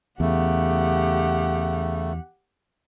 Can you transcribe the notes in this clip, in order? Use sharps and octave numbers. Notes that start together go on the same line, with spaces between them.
E2 C#3 A3 G4 F#5